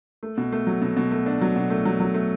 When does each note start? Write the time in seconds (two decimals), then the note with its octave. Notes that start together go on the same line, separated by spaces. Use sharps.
0.23 A3
0.38 B2
0.52 A3
0.67 F#3
0.82 B2
0.97 B2
1.11 A3
1.26 D4
1.41 F#3
1.56 B2
1.70 A3
1.85 F#3
2.00 F#3
2.14 A3